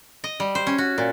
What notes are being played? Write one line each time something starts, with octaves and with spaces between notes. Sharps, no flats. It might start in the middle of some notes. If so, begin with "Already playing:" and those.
D#5
G3
C5
C#4
F#4
A#2